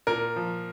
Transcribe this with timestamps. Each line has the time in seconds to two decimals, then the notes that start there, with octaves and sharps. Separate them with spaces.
0.07 A#2 A#4
0.36 F3